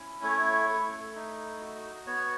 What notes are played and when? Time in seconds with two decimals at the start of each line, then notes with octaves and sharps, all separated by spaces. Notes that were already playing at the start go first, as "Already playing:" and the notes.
Already playing: C#4 E4
0.23 A3 C#5
0.70 A3
1.16 D#4
1.61 F#4
2.07 B3 C#5